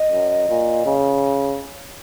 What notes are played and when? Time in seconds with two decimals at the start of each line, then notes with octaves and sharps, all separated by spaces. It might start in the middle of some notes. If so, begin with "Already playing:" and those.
Already playing: D#5
0.12 F#2
0.49 A#2
0.86 C#3